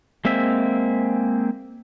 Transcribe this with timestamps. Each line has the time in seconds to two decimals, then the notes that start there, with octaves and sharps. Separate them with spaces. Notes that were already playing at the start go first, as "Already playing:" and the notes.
0.25 G#3 A#3 C4 E5